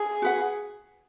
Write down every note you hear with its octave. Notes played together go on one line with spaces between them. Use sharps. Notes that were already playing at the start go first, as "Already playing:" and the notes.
Already playing: G#4
F#4 B4 F#5